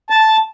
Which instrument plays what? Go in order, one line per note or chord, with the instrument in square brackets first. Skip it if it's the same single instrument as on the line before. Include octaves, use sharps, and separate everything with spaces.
[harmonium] A5